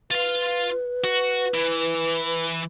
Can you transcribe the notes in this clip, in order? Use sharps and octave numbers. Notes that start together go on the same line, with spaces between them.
F4 B4 F5
F#4
E3